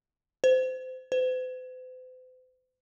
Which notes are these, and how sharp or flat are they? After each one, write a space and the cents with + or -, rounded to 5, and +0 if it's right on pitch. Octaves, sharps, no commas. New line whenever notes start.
C5 -25
C5 -45